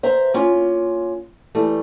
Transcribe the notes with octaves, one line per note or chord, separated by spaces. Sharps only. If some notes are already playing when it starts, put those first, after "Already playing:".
C5 E5 A#5
A#3 C#4 F4
E3 G3 A3